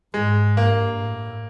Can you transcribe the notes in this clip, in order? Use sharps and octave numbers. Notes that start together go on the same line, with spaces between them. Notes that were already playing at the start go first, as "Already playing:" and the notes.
G#2 G#3
G2 A#3
A2